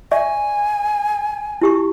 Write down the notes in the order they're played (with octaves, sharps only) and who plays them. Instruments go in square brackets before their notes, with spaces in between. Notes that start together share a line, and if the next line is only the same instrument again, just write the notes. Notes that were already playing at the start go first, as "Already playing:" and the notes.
[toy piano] D5 E5 C#6 [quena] G#5
[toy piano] E4 G4 C#6